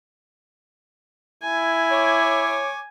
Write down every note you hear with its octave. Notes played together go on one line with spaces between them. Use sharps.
E4 G#5
C#5 D6